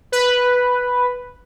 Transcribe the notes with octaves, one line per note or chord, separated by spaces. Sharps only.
B4